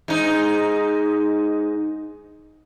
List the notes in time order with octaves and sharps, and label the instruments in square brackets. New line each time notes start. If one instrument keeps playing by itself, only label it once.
[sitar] G#2 D#4